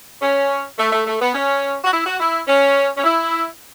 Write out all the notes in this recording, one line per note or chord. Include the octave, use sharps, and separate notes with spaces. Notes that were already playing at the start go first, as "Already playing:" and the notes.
C#4
A3
A3
A3
B3
C#4
F#4
E4
F#4
E4
C#4
C#4
E4